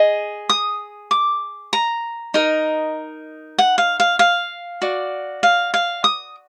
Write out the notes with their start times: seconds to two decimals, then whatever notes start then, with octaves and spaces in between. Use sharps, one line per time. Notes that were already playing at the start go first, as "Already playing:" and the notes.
Already playing: G#4 D#5
0.49 D#6
1.11 D6
1.73 A#5
2.34 D#4 A#4 D#5
3.58 F#5
3.78 F5
4.00 F5
4.19 F5
4.82 F#4 D5
5.43 F5
5.74 F5
6.04 D#6